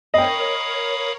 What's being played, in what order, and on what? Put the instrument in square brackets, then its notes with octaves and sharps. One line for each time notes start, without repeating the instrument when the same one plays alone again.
[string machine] A#4 C#5 [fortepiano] D#5 G5 [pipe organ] F5 B5 D#6